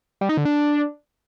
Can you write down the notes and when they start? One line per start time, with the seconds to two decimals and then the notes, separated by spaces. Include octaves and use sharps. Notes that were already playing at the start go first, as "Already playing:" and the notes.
0.21 G3
0.29 D#4
0.37 D3
0.45 D4